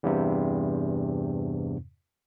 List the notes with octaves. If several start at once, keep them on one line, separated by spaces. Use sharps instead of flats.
E2 G2 C3